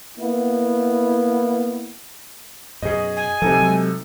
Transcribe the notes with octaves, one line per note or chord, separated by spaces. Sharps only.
A#3 B3 E4
F#2 B2 G#4 D#5
G#5
C3 F3 D#4 A4
F#3 G#3